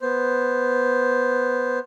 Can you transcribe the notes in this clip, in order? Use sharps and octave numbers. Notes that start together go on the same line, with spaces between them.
B3 C5